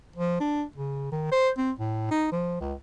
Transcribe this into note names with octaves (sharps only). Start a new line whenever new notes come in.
F3
D4
C#3
D#3
C5
C4
A2
D#4
F3
C#2